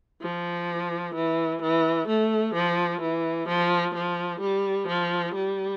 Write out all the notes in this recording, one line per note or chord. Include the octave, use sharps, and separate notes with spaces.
F3
E3
E3
A3
F3
E3
F3
F3
G3
F3
G3